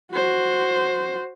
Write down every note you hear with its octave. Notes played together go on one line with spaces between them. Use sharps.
F#4 C5